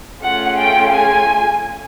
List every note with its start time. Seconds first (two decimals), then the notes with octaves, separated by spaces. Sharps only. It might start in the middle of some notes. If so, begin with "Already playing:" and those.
0.21 A3 C#4 F4 G#4 F#5
0.59 G5
0.95 G#5